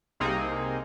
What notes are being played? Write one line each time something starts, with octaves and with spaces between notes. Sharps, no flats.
C2 C3 A#3 C4 D#4 G#4